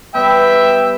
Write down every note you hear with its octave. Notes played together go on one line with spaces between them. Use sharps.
G3 B3 E5 G5